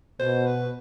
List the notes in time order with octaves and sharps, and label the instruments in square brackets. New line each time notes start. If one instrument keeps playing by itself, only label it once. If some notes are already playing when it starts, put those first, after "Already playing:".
[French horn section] B2 [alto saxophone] C5
[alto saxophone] B4